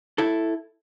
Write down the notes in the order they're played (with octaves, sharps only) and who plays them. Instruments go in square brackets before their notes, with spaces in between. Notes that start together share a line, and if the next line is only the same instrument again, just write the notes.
[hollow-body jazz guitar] E4 A4